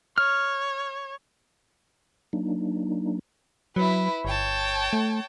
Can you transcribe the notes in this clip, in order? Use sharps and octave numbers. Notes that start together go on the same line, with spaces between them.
C#5 F6
F#3 A#3 D4 D#4
F#3 E4 B4
G1 C#5 G5 A5
A3